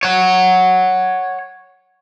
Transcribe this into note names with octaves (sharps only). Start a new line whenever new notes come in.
C#5 F#5